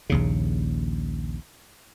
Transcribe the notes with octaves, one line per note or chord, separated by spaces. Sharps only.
A#1 D#2 C#3